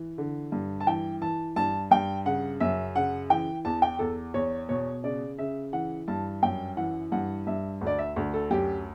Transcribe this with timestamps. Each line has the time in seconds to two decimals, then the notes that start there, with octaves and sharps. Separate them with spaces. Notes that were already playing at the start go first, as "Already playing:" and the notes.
Already playing: E3
0.18 D3
0.52 G2
0.80 A5
0.87 E3 G5
1.21 E3 A5
1.56 G2 A5
1.91 G2 G5
2.26 C#3 F#5
2.60 F#2 E5
2.96 C#3 F#5
3.30 E3 G5
3.65 E2 A5
3.82 G5
3.99 E2 A4
4.34 E2 C#5
4.69 B2 C#5
5.04 C#3 D5
5.38 C#3 E5
5.73 E3 F#5
6.08 G2 A5
6.43 F#2 G5
6.77 E3 F#5
7.12 G2 F#5
7.47 G2 E5
7.81 D2
7.87 D5
7.99 E5
8.16 D2
8.34 A4
8.50 F#2 G4